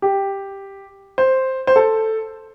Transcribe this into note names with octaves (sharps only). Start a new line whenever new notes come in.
G4
C5
C5
A4